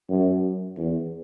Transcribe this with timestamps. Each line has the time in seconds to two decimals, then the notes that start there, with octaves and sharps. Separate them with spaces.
0.09 F#2
0.77 E2